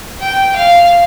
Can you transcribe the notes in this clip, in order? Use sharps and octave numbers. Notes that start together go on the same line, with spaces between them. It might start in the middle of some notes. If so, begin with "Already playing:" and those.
G5
F5